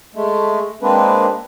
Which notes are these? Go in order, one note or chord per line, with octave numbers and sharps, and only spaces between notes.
G#3 A3
G#3 A#3 C4 D4 B4